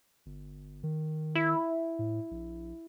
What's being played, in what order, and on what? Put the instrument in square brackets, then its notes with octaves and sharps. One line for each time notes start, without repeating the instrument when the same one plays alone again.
[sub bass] G1
D#3
[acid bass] E4
[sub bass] A2
A#1